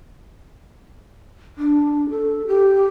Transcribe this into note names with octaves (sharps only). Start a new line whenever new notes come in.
D4
A4
G4